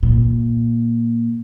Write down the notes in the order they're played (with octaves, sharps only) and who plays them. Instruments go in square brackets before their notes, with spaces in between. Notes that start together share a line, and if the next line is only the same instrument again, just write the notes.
[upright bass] A#2